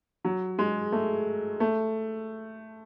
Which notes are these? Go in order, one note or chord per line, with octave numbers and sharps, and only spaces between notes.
F#3
G#3
A3
A3